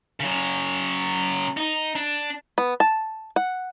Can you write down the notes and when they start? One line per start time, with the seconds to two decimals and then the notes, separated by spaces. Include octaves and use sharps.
0.20 C#3 F#3
1.57 D#4
1.96 D4
2.58 B3
2.80 A5
3.36 F#5